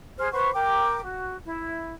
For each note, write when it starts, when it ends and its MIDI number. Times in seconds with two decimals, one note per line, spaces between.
0.18 0.30 68
0.18 0.30 72
0.18 0.30 89
0.32 0.51 71
0.32 0.51 72
0.32 0.51 78
0.32 0.51 85
0.54 0.99 70
0.54 0.99 79
0.54 0.99 86
1.02 1.35 66
1.45 1.93 64